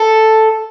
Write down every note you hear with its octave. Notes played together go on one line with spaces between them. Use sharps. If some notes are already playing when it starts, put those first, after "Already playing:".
Already playing: A4